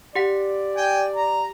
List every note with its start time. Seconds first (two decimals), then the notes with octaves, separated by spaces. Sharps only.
0.15 G4 D5 F#5 B6
0.76 G5 G#5
1.16 A#5